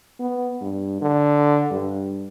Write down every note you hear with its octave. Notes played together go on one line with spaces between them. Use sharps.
B3
G2
D3
G2